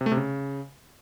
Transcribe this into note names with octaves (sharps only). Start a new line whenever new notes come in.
C3
A3
C3
C#3